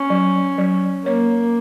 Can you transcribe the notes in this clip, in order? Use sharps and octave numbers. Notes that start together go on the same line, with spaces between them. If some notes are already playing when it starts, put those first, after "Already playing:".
Already playing: C#4
F#3
F#3
A#3 C#5